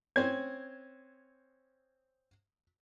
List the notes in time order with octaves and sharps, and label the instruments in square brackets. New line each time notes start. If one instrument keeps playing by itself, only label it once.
[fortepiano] C4 C#4 C5 [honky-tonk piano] G#6